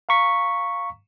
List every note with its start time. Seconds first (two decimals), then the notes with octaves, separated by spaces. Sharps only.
0.09 F5 A#5 C#6 B6